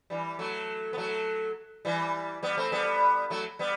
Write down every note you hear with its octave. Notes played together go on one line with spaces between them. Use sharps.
E3 G3
F#3 A3
B3
F#3 A3
E3 G3
G3 B3
A3 C4
G3 B3
F#3 A3
G3 B3